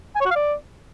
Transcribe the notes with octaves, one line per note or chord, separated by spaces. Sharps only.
G#5
C#5
F#4
F5
D5